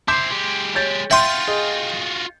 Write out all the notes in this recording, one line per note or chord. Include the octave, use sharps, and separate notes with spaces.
E4 C5 C6 D6 G6
G#3 G4
C#5 G6 A6
F4 F#4 E5 G5 C6
G#4 D#5